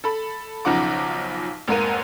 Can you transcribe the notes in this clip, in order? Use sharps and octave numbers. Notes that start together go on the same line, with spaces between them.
A4 B5
B1 C#3 F3 D#4 F#5 D6
F1 G#2 A#3 D#7